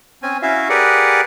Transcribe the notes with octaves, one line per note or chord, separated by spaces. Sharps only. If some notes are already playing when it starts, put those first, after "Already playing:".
C4 C#4 G#5
C#4 E4 F#4 E5 F5
G4 G#4 A#4 B4 D5 F#5